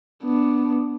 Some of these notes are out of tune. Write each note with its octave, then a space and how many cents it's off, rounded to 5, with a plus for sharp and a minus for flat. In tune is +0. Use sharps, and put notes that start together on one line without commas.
B3 +0 D4 +0